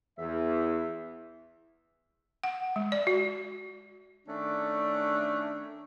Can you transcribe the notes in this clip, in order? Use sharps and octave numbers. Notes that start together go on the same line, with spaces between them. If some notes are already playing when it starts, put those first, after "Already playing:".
E2 E5
F#5
G#3
D5
F#4
D#3 A3 C#4 D4